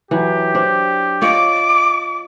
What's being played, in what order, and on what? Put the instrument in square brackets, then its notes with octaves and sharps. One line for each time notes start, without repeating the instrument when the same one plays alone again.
[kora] E3 F#3 [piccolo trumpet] G4
[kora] D4 C5
[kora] F4 C#5 D#5 [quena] D6